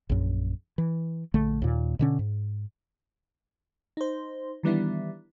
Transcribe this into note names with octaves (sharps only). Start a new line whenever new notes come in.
A#1 F#2
E3
A#1 D3 A3
D#2 A#2
B2 D3 C#4
G#2
D#4 C5
D#3 E3 G3 B3 D4 E4